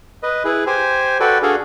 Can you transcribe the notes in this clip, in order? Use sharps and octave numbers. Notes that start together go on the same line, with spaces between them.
B4 D#5
E4 G#4 B4
G4 C5 G#5
F#4 A4 B4 D5 G5
D4 F#4 G#4 A4 F5